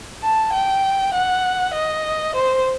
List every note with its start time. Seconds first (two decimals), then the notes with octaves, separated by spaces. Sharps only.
0.23 A5
0.53 G5
1.15 F#5
1.74 D#5
2.35 C5